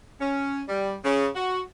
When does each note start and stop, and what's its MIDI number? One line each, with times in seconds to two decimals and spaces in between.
0.20 0.62 61
0.68 0.96 55
1.04 1.27 49
1.35 1.61 66